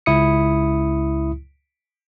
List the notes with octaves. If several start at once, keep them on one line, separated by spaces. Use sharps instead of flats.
C#2 E4 D#6 C#7